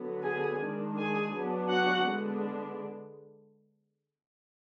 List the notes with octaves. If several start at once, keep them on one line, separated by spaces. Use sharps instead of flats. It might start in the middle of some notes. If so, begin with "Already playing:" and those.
Already playing: D3 F#3 B3
G#4 G#5
D#3 G#3 D4
G#4 G#5
F#3 B3 D4
F#4 F#5
D3 G#3 B3 D4